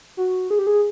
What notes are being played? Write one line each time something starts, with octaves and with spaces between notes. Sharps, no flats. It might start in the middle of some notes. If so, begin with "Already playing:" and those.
F#4
G#4
G4
G#4